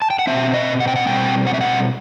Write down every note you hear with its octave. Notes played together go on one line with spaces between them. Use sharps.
A5
G5
F#5
B2 G3 C4 E5
D#5
F#5
G5
F#5
B2 G3 C4 G5
F#5
E5
F#5